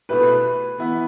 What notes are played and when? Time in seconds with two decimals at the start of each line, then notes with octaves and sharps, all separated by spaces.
0.09 B2 A3 E4 G4 B4
0.78 E3 B3 E4